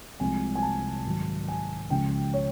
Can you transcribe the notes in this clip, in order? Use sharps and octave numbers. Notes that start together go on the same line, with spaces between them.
C2 C3 F3 G#3 G#5
G#5
A5
G#2 D#3 F#3
G#5
C#2 C#3 F3 G#3 G5
C#5